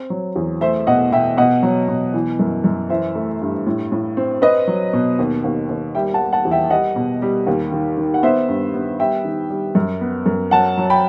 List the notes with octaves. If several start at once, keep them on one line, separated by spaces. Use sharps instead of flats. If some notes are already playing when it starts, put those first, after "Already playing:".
Already playing: C4
F#3
E2
A3 C5 E5
B2 D#5 F#5
B2 E5 G5
B2 D#5 F#5
F#3
B2
E3
F#2
F#2
E3 C5 E5
A3
G2
A2
A2
C4
C4 B4 D#5
F#3
B2
D#2
D#2
D#2
G3 E5 G5
F#5 A5
G3
F#5 A5
E2
E5 G5
G3 D#5 F#5
B2
G3
D#2
D#3
D#3
F#5
B3 C5 E5
G2
B3
G3 E5 G5
D#3
G3
F#2
B3
F#2
F#3 F#5 A5
F#3
G5 B5